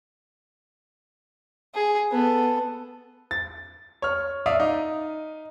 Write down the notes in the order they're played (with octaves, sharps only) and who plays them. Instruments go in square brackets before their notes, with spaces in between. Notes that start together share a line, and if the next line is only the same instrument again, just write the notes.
[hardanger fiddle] G#4
B3 A4
[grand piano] A6
C#5 F6
D5 E5 F5 D#6
D#4